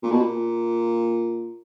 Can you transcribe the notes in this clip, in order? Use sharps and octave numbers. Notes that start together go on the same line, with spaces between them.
A#2
B2
A#2